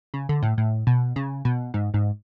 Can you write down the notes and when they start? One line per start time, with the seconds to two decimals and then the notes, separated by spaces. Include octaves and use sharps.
0.14 C#3
0.29 D3
0.43 A2
0.58 A2
0.87 B2
1.16 C#3
1.45 B2
1.74 G#2
1.94 G#2